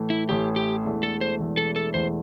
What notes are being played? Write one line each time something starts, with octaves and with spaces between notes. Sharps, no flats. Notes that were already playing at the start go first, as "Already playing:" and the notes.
Already playing: A2 E3 A3
E4
A1 A2 E3 A3 G4
G4
E1 E2 E3 A3
A4
C5
E1 E2 E3 A3
A4
A4
E1 E2 E3 A3 C5